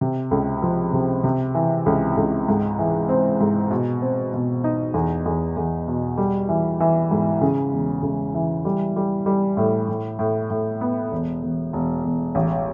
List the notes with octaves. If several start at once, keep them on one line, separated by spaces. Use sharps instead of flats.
C3
C#2
F3
C3
C3
E3
C#2
C#2
G#2
E3
C4
G#2
B2
C4
B2
D#4
E2
E2
E2
B2
G3
E3
E3
G#2
C#3
E1
C#3
E3
G3
G3
G3
A2
A2
A2
A2
B3
E1
E1
E1
E1
A1